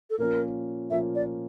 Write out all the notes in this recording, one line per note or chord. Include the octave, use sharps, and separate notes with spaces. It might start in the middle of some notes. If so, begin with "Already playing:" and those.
A4
A#2 F3 A#3 C#4 F4 A#4
A#2 F3 A#3 C#4 F4 E5
D5